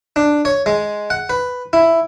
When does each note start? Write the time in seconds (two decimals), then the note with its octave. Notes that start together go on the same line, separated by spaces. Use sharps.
0.16 D4
0.45 C#5
0.66 G#3
1.10 F#5
1.30 B4
1.73 E4